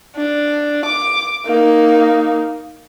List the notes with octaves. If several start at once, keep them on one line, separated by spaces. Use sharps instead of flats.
D4
D6
A#3 D#4